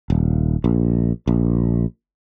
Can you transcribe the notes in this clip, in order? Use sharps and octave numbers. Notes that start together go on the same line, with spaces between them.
D#1
A#1
A#1